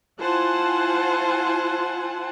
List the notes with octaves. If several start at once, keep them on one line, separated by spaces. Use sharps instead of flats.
E4 F4 C5 F#5 G#5 A5